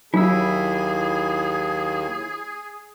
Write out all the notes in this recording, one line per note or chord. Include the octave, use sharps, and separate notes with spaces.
D#2 F#3 E4 G#4 E6